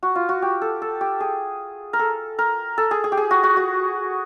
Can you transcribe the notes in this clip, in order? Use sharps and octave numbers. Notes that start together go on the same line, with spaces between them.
F#4
F4
F#4
G4
A4
A4
G4
G#4
A#4
A4
A#4
A4
G#4
G#4
G4
G#4
F#4
F#4
F#4